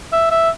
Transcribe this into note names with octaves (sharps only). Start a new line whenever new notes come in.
E5
E5